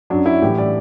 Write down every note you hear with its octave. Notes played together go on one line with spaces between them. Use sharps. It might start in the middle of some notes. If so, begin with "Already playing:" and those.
F#2 F#3 D4
E4
A2 E3 G3 G4
D5